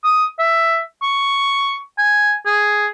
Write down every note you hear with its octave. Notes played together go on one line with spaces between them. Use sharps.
D#6
E5
C#6
G#5
G#4